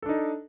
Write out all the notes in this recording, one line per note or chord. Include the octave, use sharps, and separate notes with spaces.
D4 D#4 A4